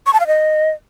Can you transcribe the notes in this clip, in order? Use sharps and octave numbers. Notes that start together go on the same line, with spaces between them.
C#6
A5
F5
D#5